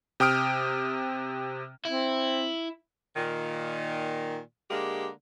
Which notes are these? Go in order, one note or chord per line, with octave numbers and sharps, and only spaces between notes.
C3 G5 D#6 F6 D7
C4 E4
A#2 D#3
D3 G#3 A#3 G4